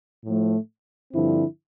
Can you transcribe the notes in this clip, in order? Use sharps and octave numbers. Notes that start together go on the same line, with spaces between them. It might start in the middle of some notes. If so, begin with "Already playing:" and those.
A2 F3 A3
G2 D3 F3 C4 E4